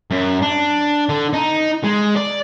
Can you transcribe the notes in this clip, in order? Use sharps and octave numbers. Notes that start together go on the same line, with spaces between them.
F#2
D4
D3
D#4
G#3
D5